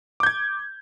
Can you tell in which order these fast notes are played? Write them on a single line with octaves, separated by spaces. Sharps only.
D6 G6 G#6